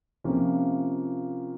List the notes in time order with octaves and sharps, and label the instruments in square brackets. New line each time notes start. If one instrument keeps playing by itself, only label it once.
[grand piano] C3 F3 A#3 C#4 F4